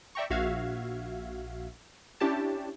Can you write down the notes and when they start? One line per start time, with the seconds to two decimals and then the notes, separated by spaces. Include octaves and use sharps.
0.15 D5 E5 G5 A#5 C#6
0.30 A#1 F#4 E5 F5 G#6
2.20 C#4 D4 E4 G4 C#5 A5